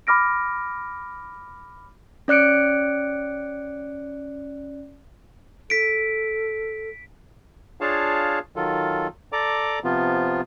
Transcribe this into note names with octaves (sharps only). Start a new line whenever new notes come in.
B5 D6 F6 A#6 D7
C#4 D5 F#6 C#7 D7
A4 B6 D7
D4 F4 G#4 C#5 F5 A5
D#3 F#3 F4 A4
A4 D5 A#5 D6
C3 F3 B3 F4